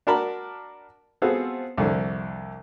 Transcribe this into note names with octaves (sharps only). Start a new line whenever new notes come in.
D4 F#4 A#4 A5 B5
B3 C4 F4 F#4 G#4 A4
C2 F2 D3